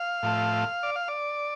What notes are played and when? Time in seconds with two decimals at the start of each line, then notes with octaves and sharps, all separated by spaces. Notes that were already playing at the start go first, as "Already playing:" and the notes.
Already playing: F5
0.23 A2 F3 A3
0.83 D5
0.96 F5
1.08 D5